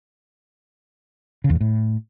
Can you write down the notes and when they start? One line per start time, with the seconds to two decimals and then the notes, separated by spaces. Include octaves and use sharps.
1.44 C#3
1.50 E2
1.55 A#2
1.61 A2